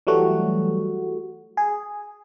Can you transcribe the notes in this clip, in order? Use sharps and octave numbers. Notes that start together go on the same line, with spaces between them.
E3 F#3 G3 A3 F#4
G#4